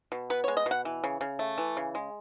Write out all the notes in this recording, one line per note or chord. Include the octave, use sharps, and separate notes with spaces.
B2
B3 B4
G#3 C#5
D#5
B2 F#5
E3
C#3
C#3
A3
E3
C#3
G#3